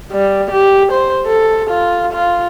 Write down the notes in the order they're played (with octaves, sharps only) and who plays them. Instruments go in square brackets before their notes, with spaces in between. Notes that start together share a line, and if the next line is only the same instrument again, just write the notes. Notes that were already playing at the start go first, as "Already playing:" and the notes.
[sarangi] G3
G4
C5
A4
F4
F4